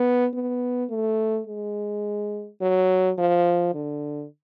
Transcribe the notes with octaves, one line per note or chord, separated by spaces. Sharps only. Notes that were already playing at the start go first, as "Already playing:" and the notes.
Already playing: B3
B3
A3
G#3
F#3
F3
D3